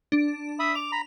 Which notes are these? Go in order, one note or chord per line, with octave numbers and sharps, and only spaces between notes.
D4
E5 B5 D#6
D6 F7
A#5 B5